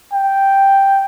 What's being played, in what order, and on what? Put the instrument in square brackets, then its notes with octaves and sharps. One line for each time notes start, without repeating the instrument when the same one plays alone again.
[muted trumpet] G5